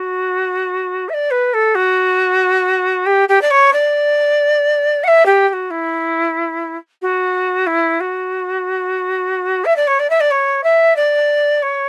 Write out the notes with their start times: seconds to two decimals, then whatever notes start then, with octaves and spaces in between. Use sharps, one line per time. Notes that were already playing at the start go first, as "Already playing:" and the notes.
Already playing: F#4
1.09 E5
1.14 D5
1.31 B4
1.54 A4
1.75 F#4
3.06 G4
3.29 G4
3.41 D5
3.51 C#5
3.73 D5
5.04 F#5
5.08 E5
5.26 G4
5.48 G4
5.53 F#4
5.70 E4
7.02 F#4
7.67 E4
8.00 F#4
9.65 E5
9.76 D5
9.87 C#5
9.99 D5
10.10 E5
10.20 D5
10.31 C#5
10.64 E5
10.96 D5
11.62 C#5